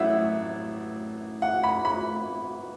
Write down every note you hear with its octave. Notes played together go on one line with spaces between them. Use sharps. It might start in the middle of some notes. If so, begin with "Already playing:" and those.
Already playing: A1 A2 F#3 A3 E5 F#5
F#5
B5
B5